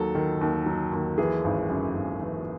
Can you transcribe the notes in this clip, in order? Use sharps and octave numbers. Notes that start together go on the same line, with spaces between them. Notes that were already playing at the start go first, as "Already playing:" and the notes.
Already playing: D#2 F#3 A4
D#3
D#2
F#3
D#2
E3 G#4
G#1
F#2
G#1
E3